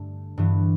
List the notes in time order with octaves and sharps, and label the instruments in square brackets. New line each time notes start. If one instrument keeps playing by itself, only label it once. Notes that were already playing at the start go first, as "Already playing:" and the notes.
Already playing: [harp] G2 D3 A3
G2 E3 B3